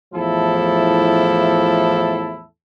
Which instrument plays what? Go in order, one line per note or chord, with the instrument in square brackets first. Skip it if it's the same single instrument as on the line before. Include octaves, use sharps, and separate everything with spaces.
[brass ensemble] E2 A2 F3 E4 A4